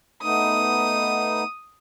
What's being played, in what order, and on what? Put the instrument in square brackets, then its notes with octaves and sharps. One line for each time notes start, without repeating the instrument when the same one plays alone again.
[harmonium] A3 B3 D#4 [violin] D#6